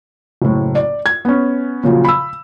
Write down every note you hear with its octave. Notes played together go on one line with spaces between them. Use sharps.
F#1 A2
D5
G#6
B3 C#4
A#2 C#3 F3 F#3
B5 E6